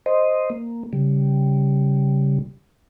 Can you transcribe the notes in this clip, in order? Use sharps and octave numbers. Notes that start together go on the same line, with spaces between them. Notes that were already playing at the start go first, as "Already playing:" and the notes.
C5 D#5
A#3
C#3 G3